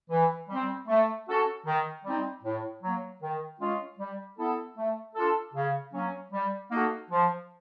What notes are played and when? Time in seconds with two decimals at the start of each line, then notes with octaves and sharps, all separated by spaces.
0.10 E3
0.50 G3 C4
0.88 A3
1.27 C#4 F#4 A4
1.66 D#3
2.04 G3 C4 D#4
2.43 A2
2.82 F#3 A#3
3.21 D#3
3.60 G#3 C#4 F4
3.98 G3
4.38 B3 E4 A4
4.76 A3
5.15 D4 F4 A4
5.54 C#3
5.93 F#3 A#3 C#4
6.32 G3
6.70 A#3 D#4 F#4 A4
7.10 F3